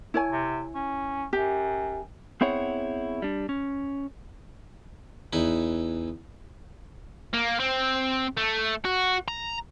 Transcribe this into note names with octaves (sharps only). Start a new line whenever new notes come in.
E4 C#5 G#5
C3
C#4
F#2 G4
B3 C4 E4 G#4 C#5 F#5
G3 D4
C#4
E2 D#4 E4 B4
A#3
C4
A3
F#4
A#5